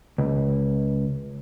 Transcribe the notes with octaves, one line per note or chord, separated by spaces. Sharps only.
C#2